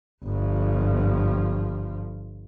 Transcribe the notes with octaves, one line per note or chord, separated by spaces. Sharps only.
G1 F3